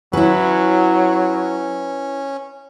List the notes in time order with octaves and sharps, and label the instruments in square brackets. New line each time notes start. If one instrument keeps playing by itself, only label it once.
[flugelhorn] F#3 [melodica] C#4 [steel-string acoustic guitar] E4 B4